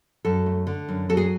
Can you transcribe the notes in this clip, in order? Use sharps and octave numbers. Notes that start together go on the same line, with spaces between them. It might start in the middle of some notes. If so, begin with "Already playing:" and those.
F#2 A4
A3
D3
F#2
F#3 A4
G#4